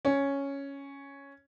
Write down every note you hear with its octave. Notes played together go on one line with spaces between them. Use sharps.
C#4